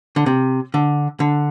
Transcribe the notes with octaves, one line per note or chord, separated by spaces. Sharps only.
D3
C3
D3
D3